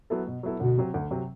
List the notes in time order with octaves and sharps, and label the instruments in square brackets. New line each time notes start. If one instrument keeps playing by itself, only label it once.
[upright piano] F#3 B3 E4 A4
B2
F#3 B3 E4 A4
[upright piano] D2 [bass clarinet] B2
[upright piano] C3 F#3 C4
D2
C3 F#3 C4